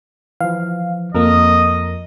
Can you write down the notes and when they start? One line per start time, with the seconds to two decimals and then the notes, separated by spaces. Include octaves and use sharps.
0.41 E3 F3 F5
1.15 F2 F3 A#3 A4 A#4 D#5